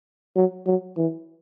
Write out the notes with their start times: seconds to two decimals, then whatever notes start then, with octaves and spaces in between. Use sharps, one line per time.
0.36 F#3
0.66 F#3
0.97 E3